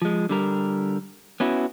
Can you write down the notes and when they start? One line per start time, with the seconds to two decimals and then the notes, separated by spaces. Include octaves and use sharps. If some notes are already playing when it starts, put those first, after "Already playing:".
0.02 F3 G#3
0.29 D3 G3 A#4
1.40 B3 C#4 E4 F#4